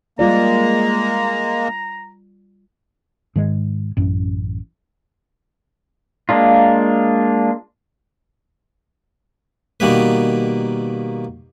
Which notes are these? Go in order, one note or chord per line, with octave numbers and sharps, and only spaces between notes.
G3 G#3 A#3 F4 D5 A#5
G#2 D#3 G#3
A1 F#2
G#3 A#3 D4 F4
B2 D#3 G3 A#3 B4